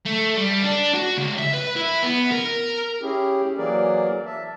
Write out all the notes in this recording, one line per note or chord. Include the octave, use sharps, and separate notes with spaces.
A3
G3
D4
F#4
C#2
E5
B4
E4
B3
A#4
C#4 E4 G4 G#4
E3 F#3 A#3 G#4 A#4 D5
E5 A5